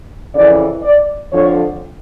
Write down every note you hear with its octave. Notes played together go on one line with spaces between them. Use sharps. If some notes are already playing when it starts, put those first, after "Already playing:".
F2 C#3 E3 D5
D5
F2 D3 F3 C#5